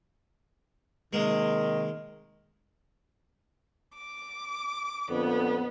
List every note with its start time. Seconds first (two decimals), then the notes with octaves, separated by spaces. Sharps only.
1.13 C3 D#3 G#3 A#3
3.94 D6
5.10 F2 A#2 D3 B3